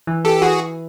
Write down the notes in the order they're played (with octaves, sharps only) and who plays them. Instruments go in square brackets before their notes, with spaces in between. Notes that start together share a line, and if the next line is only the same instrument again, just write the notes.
[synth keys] E3
[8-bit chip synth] G4 A4
[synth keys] E3 [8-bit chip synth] F#4 G#4